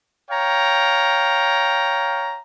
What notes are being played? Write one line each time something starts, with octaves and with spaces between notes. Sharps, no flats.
C#5 F5 G5 A#5